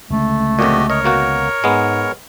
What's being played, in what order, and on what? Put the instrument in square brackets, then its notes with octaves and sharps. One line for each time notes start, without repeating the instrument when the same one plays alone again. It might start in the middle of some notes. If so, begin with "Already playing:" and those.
[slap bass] C#2 D3 [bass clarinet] A3
[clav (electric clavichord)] F2 A#2 [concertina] F#4 G4 D#5
[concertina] A#4 C#5 [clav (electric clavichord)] D#5
[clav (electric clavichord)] B2 A#3 F#4
[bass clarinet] G#2 [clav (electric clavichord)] G#3 B3